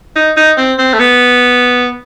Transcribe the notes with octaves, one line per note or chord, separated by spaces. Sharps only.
D#4
D#4
C4
C4
A3
B3